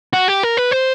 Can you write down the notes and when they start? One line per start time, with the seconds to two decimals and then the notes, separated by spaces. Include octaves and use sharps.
0.13 F#4
0.28 G4
0.43 A#4
0.57 B4
0.71 C5